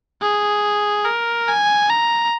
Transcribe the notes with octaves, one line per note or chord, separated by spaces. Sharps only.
G#4
A#4
G#5
A#5